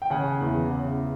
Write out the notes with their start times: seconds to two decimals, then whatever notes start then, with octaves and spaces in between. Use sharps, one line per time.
0.02 G5
0.10 C#3 F#5 G#5
0.41 E2
0.71 C#3